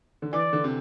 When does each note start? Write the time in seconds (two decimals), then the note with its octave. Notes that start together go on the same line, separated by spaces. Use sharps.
0.22 D3
0.33 E3 D5
0.53 D3
0.64 C3